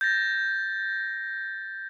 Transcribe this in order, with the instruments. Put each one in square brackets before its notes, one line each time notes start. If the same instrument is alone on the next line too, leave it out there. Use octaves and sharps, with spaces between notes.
[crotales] G6 A6 A#6